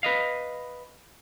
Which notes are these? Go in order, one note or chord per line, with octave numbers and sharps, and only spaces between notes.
B4 D#5 F5